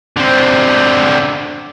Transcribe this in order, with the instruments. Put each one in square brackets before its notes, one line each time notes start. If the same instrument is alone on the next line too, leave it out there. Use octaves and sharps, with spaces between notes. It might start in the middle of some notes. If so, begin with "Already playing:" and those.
[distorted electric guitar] D3 C4